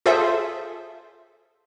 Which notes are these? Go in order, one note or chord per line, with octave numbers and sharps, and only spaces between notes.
F4 G#4 A4 C5 E5